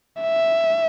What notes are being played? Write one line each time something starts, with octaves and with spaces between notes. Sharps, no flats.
E5